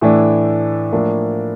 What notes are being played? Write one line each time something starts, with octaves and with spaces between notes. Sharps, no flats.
A2 E3 A3 D4
A2 F3 A#3 D4